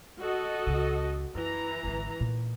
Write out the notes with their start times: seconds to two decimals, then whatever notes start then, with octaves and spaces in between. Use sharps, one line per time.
0.20 F#4 A4 D#5
0.67 C#2 C#3
1.34 F#2 E3 A#5
1.83 G#1 D3
2.20 A#2